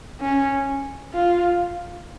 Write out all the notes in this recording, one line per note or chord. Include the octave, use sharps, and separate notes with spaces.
C#4
F4